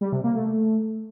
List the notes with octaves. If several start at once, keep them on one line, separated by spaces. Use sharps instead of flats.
G3
C3
A#3
A3